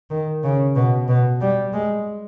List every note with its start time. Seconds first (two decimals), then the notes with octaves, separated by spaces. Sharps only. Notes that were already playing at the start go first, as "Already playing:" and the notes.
0.10 D#3
0.43 C#3
0.76 B2
1.08 B2
1.41 G3
1.73 G#3